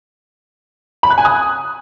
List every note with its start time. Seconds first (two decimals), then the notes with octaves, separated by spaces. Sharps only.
1.03 B5
1.10 F#6
1.18 G#5
1.25 D#6